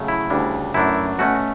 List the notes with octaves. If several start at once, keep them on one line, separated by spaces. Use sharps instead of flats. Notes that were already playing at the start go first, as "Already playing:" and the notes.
Already playing: C#3 F#3 A3
E4
D2 C#3 G3 D4
F#2 E3 A3 D4 E4
B2 A3 C#4 F#4